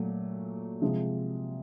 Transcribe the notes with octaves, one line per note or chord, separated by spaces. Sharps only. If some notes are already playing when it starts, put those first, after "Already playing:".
Already playing: A#2 F#3 A3
C3 F3 G#3